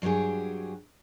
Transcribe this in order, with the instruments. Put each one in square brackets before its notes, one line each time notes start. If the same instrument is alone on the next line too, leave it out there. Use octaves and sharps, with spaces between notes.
[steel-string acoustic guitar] G2 F#3 C4 G4 G#4